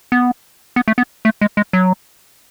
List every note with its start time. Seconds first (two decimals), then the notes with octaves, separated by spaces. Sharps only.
0.12 B3
0.76 B3
0.88 A3
0.98 B3
1.25 A3
1.41 G#3
1.57 G#3
1.73 F#3